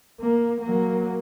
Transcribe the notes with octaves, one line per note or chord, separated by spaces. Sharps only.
A#3
F#3 A#3